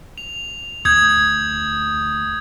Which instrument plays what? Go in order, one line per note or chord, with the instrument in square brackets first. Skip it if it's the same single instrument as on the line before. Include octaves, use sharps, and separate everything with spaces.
[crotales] F7
[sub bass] D2 [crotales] D#6 G6 G#6